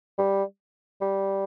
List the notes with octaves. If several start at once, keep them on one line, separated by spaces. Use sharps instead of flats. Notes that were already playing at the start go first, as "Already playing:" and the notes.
G3
G3